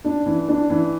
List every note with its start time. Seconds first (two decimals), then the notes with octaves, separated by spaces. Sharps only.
0.05 D4
0.26 E3
0.48 D4
0.70 E3